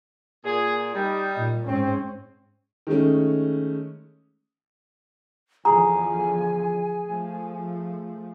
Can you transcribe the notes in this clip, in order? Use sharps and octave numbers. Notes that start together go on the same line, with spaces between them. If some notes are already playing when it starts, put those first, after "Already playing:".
A#2 G#4
G3 D#4
A#2
G#2 C4 C#4
D#3 G#3 A3 C#4
E2 D3 F3 G#4 G#5 A#5
F3 A3